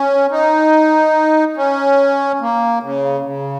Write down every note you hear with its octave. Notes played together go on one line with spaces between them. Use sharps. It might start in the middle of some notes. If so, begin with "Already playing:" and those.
Already playing: C#4
D#4
C#4
A#3
C#3
C#3